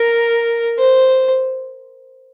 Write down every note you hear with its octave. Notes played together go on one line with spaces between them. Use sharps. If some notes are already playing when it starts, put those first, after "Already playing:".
Already playing: A#4
C5